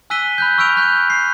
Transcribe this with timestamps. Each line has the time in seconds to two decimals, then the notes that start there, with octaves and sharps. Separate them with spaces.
0.10 G#5 E6 F#6 B6 D#7 G7
0.38 B5 F#6 G6
0.58 C#6 E6 F6 G6 D7 F7
0.76 C#6 F#6 G6
1.10 C7